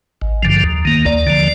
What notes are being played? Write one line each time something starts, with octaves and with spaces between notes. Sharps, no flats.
G#1
G2 D3 F3
D#2
D#3 A#3
D#2 D5
D3 F3